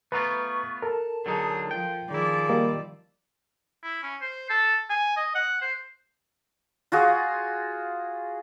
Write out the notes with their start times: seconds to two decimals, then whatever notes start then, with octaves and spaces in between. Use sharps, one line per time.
0.12 A3 B3 F4 B4 A#5 C#6
0.82 A4 A#4 A5
1.26 D3 F#3 D#4 G#4
1.71 F3 G5
2.10 D#3 F3 E4 G#4 D5
2.49 G3 A#3 D#5
3.84 E4
4.03 C#4
4.21 C5
4.50 A4
4.90 G#5
5.17 D#5
5.35 F#5
5.61 C5
6.92 F4 F#4 G#4